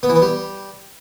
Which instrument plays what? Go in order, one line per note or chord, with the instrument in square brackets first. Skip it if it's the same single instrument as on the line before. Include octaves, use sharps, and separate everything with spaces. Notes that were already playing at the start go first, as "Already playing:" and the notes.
[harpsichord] B3
E3
B3
G3